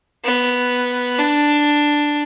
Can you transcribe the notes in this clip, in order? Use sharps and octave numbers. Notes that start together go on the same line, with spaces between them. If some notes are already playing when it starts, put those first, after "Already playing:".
B3
D4